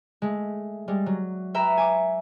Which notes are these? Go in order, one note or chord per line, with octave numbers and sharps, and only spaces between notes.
G#3 A3
G3 G#3
F#3
B4 E5 G5 A#5
G#5 D6